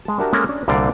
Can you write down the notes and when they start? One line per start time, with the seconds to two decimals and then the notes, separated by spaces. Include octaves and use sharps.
0.05 G#3 A5
0.19 D4 F#4 G4 A#4 E5 A5
0.33 G#3 A#3 C#4 A4 A#4
0.49 C#4 D4
0.68 C2 A#2 D3 G3 D5 F5